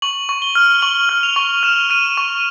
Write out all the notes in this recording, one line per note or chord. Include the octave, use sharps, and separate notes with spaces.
C#6 F#7
C#6
G7
F6
C#6 F#7
F6
F7
C#6
F6 E7
F6 D#7
C#6